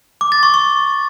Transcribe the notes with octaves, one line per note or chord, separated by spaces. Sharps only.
D6
A6
C#6
C#6